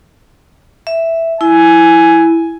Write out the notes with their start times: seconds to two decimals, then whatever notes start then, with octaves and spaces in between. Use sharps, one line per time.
0.87 E5
1.41 E4 G#5